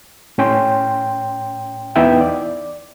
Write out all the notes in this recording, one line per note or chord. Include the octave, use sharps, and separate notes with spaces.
A2 C#4 G5 C6
E2 B3 D#4 E4 E5 G5
D5